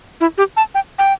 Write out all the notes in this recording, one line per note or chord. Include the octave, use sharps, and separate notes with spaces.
E4
G4
A5
G5
G5